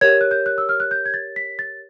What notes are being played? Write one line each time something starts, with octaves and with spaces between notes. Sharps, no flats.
G4 A#4 C#5 G#6
F#6
G6
F#6
E6
F6
F#6
G6
G#6
A6
B6
A6